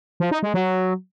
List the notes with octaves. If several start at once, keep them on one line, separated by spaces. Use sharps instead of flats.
F3
D#4
G#3
F#3